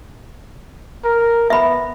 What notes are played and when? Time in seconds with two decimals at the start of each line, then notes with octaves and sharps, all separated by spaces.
1.05 A#4
1.50 B3 E5 B5